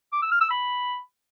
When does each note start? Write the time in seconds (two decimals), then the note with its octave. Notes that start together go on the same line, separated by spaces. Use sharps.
0.13 D6
0.22 E6
0.32 F6
0.41 E6
0.50 B5